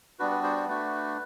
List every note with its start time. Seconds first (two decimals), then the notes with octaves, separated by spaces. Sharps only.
0.19 G3 B3 D4 F#4 B4
0.31 B4
0.43 C5
0.56 C5
0.68 A3 D4 F#4 B4